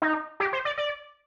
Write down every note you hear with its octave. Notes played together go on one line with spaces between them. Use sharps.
D#4
G4
C5
D5
D5